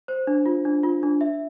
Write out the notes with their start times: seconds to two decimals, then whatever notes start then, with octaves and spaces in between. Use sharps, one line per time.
0.08 C5
0.27 D4
0.46 F4
0.65 D4
0.83 F4
1.03 D4
1.21 E5